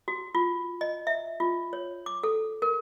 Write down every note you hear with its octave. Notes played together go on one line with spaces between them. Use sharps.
F#4
F4
D#5
E5
F4
C#5
D6
A4
A#4